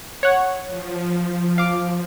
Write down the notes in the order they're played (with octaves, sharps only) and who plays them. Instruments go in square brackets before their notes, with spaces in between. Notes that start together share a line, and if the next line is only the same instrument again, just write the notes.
[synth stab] C#5 F#5
[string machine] F3
[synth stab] F5 D6